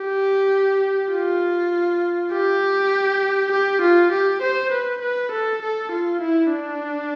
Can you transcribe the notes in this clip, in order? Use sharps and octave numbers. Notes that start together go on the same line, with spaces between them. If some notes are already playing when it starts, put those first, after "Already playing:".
Already playing: G4
F4
G4
G4
F4
G4
C5
B4
B4
A4
A4
F4
E4
D4